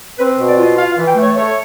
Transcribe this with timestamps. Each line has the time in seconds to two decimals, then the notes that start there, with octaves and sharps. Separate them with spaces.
0.18 C4 B4
0.38 B2
0.48 D5
0.58 F4 D#5
0.77 F4 F5
0.92 F5
0.97 E3
1.07 G5
1.16 A3
1.22 C#5
1.36 A3 C#5